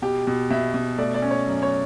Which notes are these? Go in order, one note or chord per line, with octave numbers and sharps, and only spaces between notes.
B2 G4
B2
B2 E5
B2
A3 D5
D5
C#4
C#5
F#2
C#5